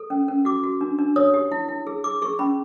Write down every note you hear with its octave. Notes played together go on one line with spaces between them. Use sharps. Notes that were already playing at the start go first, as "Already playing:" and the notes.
Already playing: A4
C#4
C#4
F#4 D6
F#4
D4
D4
C#5 D#6
G4
E4
E4
G#4
G#4 D6
G#4 C#6
C#4 B5